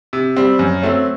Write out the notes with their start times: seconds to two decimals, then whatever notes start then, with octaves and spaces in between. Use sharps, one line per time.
0.13 C3
0.36 G3 C4
0.59 F#2
0.82 F#3 A3 C4